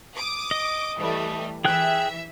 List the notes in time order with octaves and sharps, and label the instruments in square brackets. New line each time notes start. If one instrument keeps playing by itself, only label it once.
[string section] D6 D#6
[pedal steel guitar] D#5
[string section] E3 G3 A3
[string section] E3 E5 [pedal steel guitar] G#4 G5 F#6